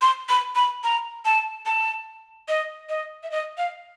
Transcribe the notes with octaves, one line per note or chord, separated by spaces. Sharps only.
C6
B5
B5
A#5
A5
A5
D#5
D#5
E5
D#5
F5